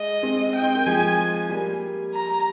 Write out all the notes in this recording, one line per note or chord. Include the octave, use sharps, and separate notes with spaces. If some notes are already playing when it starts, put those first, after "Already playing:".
Already playing: G#3 D#5
G#3 C4
G5
C4
A#3
F3 G#3 G#5
G3 A#3
A#5